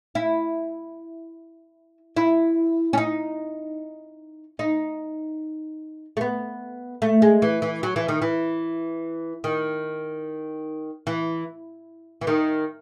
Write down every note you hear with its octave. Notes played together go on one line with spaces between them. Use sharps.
E4
E4
C#4
D#4
D#4
A3
B3
A3
G#3
E3
E3
F#3
E3
D#3
E3
D#3
E3
E3
D#3